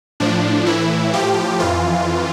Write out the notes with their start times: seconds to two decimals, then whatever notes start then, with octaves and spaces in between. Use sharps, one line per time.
0.20 A2 F3 D4
0.66 A2 E3 E4
1.13 A2 F3 G4
1.60 F2 E3 F4